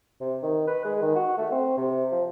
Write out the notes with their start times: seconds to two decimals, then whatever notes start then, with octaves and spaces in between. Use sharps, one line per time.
0.21 C3
0.43 D#3
0.67 B4
0.85 G#3
1.02 D#3
1.15 F#4
1.38 A3
1.51 C4
1.77 C3
2.12 F3